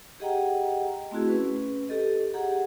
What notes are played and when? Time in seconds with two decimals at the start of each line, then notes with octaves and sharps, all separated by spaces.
0.20 G4 G#4 D#5 F#5 G5 A#5
1.11 A3 C4 E4 F#4 G#4
1.28 C#4 B4
1.89 G4 A4 D#5
2.34 G4 G#4 F#5 A#5